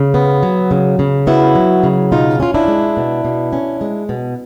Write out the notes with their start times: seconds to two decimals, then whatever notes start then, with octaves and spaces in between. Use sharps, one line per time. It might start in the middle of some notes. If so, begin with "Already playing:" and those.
Already playing: C#3
0.14 B3
0.43 F#3
0.71 C#3
0.99 C#3
1.27 B3 E4 F#4
1.55 F#3
1.83 C#3
2.12 B2 D#4 F4
2.40 C#4 F4
2.54 D4 E4
2.68 G#3
2.97 B2
3.25 B2
3.53 C#4
3.81 G#3
4.09 B2